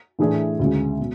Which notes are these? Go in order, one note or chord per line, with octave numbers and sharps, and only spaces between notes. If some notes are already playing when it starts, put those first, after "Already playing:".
A2 E3 A3 D4 G#4
D2 C#3 G#3
B2